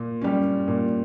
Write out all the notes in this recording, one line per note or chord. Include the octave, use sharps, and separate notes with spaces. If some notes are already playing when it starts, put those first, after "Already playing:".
Already playing: A#2
G3 C#4
A#2